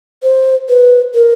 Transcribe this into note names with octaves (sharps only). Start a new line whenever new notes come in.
C5
B4
A#4